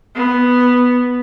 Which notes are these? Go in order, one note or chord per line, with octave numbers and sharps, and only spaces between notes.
B3